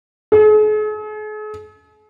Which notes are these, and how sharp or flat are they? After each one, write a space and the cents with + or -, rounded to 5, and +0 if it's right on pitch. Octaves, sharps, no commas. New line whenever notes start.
G#4 +45